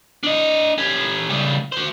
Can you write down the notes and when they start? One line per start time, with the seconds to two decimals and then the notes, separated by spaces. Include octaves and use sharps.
0.23 D4 D#5
0.78 C#4 G4
1.30 C#3 G3
1.72 F#4 C5